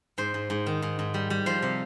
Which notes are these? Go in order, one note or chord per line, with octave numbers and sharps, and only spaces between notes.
G#2 C5
G#2
G#2
D#3
G#2
G#2
G3
G3
F3 C5
C3